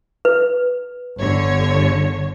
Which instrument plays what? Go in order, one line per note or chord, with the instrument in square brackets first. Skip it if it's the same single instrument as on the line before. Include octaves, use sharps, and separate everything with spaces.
[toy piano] B4
[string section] G1 D3 C#5